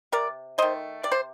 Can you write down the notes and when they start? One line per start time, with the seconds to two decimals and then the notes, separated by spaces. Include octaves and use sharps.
0.12 C3 A#4 D5
0.58 D#3 A3 C5 D#5
1.03 C3 D5
1.12 C5